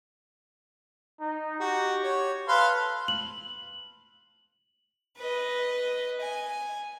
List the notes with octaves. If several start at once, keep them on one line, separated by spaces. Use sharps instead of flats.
D#4
F#4 G4
C#5
A4 B4 F5 C6
F#7
B4 D#5
G#5